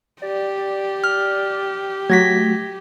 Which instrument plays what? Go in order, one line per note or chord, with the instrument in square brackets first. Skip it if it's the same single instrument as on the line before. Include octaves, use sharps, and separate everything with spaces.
[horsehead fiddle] G4 [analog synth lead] D5
[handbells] F6
[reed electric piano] F#3 F#4 [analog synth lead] A3 [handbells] G#6 A#6 B6